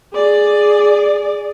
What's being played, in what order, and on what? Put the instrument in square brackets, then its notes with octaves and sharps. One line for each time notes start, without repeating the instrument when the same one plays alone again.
[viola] G#4 D5